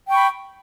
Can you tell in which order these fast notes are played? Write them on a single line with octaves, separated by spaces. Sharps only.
G5 C#6 B5